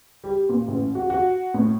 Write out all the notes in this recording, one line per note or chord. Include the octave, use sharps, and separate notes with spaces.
G3
A#2
A1
F#4
F#4
A2